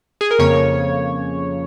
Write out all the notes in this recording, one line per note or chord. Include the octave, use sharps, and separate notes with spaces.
G#4
A#4
F2 C#3 A#3 C#5